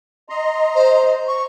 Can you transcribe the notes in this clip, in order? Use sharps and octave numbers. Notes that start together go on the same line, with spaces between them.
D#5 A#5 C6
C5
C#6